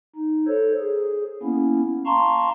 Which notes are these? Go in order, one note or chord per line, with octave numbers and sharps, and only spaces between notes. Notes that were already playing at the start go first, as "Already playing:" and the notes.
D#4
A4 C5 C#5
G#4
A#3 B3 C#4 E4
F5 A5 A#5 C6 C#6